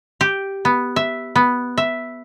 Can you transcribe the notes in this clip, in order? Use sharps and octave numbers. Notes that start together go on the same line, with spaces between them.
G4
B3
E5
B3
E5